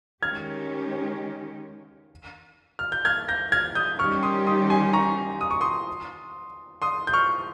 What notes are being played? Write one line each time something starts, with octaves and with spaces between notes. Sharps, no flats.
D#3 G#3 C#4 G4 F6 G#6
F6
G6
F6 G#6
G6 A#6
F6 G#6
D#6 G6
D#3 G3 C#4 G4 C#6 F6
C6 D#6
C6 D#6
G#5 C6
A#5 C#6
D#6
C#6
C6 D#6
C6 D#6
G6
C#6 F6